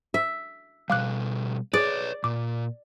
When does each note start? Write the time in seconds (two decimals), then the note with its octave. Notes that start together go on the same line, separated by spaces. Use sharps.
0.14 E5
0.90 B2 G3 F5 D6 F#6
1.74 G#4 B4 C#5 D5
2.24 A#2 D6